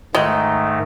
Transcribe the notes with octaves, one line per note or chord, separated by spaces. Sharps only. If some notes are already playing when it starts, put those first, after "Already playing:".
G#2 D#3 G#3 A3